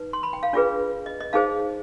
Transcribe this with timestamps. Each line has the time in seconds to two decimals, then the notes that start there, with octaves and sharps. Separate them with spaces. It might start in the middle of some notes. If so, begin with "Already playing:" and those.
Already playing: D#4 B4
0.13 C6
0.23 B5
0.33 G5
0.43 F5
0.53 D4 F4 G#4 B4 D5
1.06 D#5
1.20 D#5
1.33 D#4 G#4 C5 F5